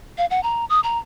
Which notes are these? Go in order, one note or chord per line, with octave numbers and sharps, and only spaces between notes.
F5
F#5
A#5
D#6
A#5